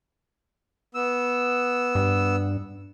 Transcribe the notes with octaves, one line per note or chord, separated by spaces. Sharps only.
B3 E6
G2